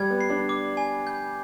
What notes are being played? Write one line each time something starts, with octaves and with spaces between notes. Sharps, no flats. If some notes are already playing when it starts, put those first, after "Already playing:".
Already playing: G3 G#6
B3
C7
D4
D6
G#5
G6